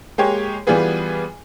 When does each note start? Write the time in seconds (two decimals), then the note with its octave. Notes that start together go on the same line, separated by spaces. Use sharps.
0.18 G#3 A#3 G4 G#4 C#5
0.67 E3 G3 B3 F4 G#4 B4